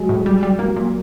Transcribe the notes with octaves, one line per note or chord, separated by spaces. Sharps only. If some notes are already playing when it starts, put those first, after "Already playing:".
Already playing: F#3 G#3
A2
G3
G3
F#3 A#3
A#2